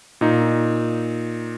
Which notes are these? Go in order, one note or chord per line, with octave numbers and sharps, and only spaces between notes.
A#2 D#4